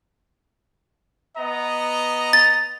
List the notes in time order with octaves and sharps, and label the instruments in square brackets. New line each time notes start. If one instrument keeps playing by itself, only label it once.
[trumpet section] B3 D#5 A#5
[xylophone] A6